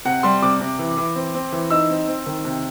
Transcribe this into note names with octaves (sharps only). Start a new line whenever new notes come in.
C3 F#5
G3 C6
C3 D6
C3
E3
E3
C4
C4
E3
D#4 E6
C4
C4
D#3
C3